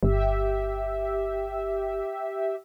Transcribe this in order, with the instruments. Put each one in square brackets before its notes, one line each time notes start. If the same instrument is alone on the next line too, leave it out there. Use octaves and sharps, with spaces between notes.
[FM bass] G1 [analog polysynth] G4 E5